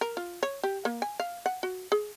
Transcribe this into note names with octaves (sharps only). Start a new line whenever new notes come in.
A#4
F4
C#5
G4
A#3
G#5
F5
F#5
F#4
G#4